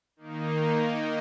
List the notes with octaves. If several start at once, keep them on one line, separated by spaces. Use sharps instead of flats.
D#3 A#3 D#4